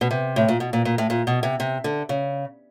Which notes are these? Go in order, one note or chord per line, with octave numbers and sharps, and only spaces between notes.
B2
C3
A2
A#2
B2
A#2
A#2
A2
A#2
B2
C3
C3
D3
C#3